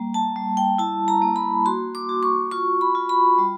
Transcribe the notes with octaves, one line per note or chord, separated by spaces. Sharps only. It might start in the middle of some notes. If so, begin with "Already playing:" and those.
Already playing: G3 A#3
A5
G3
G5
E4 A5
A#5
A#3
B5
F#4 C6
D6
F#4
C#6
F4 C#6
B5
F4
B5
G3